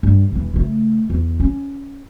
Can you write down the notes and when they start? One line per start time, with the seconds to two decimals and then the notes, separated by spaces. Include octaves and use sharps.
0.03 G2
0.32 E1 E3
0.54 C#3 A3
1.10 E2
1.40 C#4